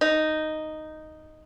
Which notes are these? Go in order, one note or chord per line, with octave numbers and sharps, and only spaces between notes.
D#4